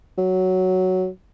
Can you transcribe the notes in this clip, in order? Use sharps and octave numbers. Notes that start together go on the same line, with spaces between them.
F#3